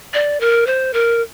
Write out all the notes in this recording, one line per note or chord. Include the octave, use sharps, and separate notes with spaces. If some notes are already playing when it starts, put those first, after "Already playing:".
D5
A#4
C5
A#4